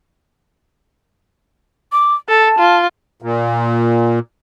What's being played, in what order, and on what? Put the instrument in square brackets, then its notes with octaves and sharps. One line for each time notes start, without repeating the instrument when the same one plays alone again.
[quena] D6
[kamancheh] A4 [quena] A5
[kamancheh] F4
[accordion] A#2